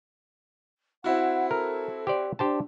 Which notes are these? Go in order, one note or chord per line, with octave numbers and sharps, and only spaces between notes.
C4 E4 F#4 F#5
A4 A#4
G4 C5 D5
D4 G4 C5 A5